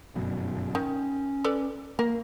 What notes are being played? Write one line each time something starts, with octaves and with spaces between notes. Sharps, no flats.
G1 F#2 B2
D#3 C#4
A4 B4 D5
A#3 A#4